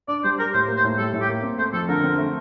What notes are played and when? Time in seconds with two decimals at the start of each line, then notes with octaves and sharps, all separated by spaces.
0.08 D4 D5
0.24 G3 C5
0.38 G4 A#4
0.53 A2 C5
0.68 A#3
0.76 C5
0.84 A2
0.98 G3 A4
1.14 A2
1.21 G4
1.29 A#3
1.43 C4
1.58 A3 C5
1.73 F2 A4
1.89 D3 A#4
2.04 C4
2.18 A3